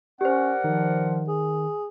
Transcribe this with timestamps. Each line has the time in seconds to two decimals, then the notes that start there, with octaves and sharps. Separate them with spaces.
0.21 C#4 G4 A#4 C5 D5 F#5
0.64 D#3 F3
1.28 G#4